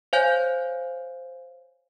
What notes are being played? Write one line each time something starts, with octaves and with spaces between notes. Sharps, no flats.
C5 C#5 F5 G#5 G6